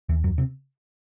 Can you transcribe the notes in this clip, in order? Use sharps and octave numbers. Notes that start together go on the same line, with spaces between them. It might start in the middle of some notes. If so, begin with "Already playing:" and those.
D#2 E3
F#2 F#3
C3 C4